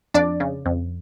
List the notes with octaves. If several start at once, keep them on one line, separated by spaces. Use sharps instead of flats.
F2 D4 D5
C#3
F2